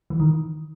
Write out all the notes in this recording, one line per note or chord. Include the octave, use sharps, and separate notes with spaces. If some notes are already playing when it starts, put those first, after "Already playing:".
E3
D#3